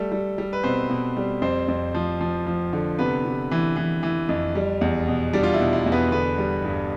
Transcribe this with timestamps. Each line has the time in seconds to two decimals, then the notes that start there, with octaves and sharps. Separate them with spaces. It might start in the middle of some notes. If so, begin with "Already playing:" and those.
Already playing: G3 A3 A4
0.12 G3
0.38 G3
0.53 B4
0.64 B2 C4 C5
0.90 B2
1.17 G3
1.42 F2 C4 C5
1.68 F2
1.94 F3
2.21 F3
2.46 F3
2.73 D3
2.99 C3 B3 B4
3.25 C3
3.51 E3
3.76 E3
4.03 E3
4.29 F2
4.55 G3
4.81 E2
5.08 B2
5.33 G3 D4 D5
5.43 F4
5.53 E4
5.60 B2
5.73 E4
5.86 E2
5.92 B3 B4
6.12 D3 B3 B4
6.38 G3
6.65 G2